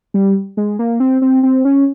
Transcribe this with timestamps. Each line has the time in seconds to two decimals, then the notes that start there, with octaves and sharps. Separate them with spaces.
0.14 G3
0.57 G#3
0.79 A#3
1.00 C4
1.22 C4
1.43 C4
1.65 C#4